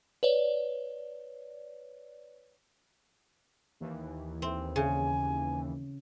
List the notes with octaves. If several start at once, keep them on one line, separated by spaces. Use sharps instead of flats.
B4 C#5 D5
D#2 E3
C4
C#3 G#5